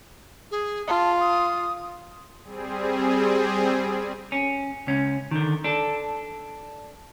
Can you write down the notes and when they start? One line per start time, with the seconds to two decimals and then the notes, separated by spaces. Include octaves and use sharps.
0.51 G#4
0.88 F4 A5
1.20 D#6
2.44 G3 C4 G#4
4.32 C#4
4.87 C#2 C#4
5.31 D3 D#3
5.64 D4 A4